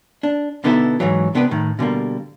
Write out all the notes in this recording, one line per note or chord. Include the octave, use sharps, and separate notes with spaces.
D4
B2 D3 B3 D#4 E4 A4
G#2 E3 F#3
C3 B3 D4 G4 A#4 B4
A2 D#3
B2 D3 G3 A#3